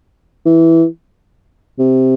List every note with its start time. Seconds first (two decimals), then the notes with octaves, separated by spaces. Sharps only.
0.46 E3
1.79 C3